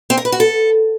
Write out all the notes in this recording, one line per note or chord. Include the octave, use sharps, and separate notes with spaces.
C4
A#4
B4
F#4
A4